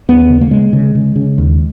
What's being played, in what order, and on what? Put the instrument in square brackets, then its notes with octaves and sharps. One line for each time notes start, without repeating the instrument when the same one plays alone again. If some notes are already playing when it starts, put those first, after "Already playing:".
[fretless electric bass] D#2 B3
C#3
A#3
C#3 G#3
C#3
C#3
C#3
D#2